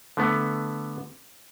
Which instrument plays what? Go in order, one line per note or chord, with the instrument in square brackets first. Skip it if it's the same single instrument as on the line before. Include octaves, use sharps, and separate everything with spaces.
[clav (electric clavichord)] D3 A3 B3